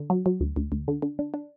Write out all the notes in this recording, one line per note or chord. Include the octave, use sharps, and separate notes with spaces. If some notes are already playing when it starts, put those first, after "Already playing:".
Already playing: D3
F#3
F#3
D2
D2
D2
D3
D3
D4
D4